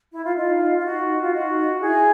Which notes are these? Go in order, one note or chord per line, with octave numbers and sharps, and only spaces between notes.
E4
F4
D#4 F4
F4
D#4 F#4
F4
D#4 F#4
E4 G#4